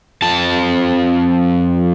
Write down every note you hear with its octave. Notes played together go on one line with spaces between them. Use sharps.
F2 A5